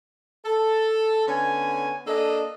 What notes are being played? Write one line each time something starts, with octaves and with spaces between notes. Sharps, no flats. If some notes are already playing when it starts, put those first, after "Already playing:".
A4
D3 B3 C#4 G#5
A#3 D4 A4 D#5